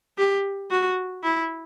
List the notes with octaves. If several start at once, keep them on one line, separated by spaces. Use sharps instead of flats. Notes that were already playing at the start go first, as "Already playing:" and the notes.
G4
F#4
E4